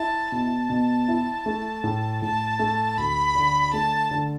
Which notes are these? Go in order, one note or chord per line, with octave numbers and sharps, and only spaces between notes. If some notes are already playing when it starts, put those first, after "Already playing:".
Already playing: E4 A5
B2 A5
B2
E4
A3
A2
A2 A5
A3
D2 B5
D3
A3 A5
D3